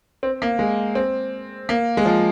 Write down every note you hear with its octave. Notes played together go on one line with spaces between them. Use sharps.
C4
A#3
G#3
C4
A#3
G#3
F3